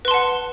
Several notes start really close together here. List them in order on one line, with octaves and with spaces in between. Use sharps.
B4 C6 A5 F#5